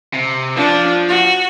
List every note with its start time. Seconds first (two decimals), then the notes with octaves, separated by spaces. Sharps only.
0.14 C3
0.56 F3 D4
1.09 F#4